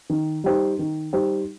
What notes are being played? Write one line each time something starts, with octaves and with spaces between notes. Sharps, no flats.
D#3
G3 D#4 G4 C5
D#3
G3 D#4 G4 C5